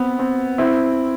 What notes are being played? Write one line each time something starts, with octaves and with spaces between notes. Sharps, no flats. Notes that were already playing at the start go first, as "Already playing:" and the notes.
Already playing: B3 C4
C4
C4 E4